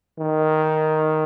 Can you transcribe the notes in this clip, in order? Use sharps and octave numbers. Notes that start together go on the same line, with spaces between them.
D#3